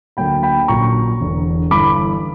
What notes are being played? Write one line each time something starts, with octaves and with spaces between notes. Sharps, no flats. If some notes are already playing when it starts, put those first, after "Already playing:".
D2 D3 F#3 A#3 G5 B5
G5 B5
A#1 A#2 F#3 C#4 A#5 C#6
E1 E2 D3
G1 G2 E3 B5 D6